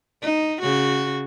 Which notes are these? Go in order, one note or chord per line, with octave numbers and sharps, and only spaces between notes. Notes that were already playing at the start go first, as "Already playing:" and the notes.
D#4
C#3 F#4